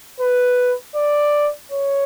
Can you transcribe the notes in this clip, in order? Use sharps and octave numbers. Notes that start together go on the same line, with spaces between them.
B4
D5
C#5